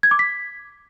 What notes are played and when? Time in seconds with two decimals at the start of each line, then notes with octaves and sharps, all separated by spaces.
0.03 G#6
0.11 D6
0.19 B6